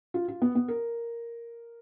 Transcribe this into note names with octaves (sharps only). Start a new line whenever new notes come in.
F4
F4
B3
B3
A#4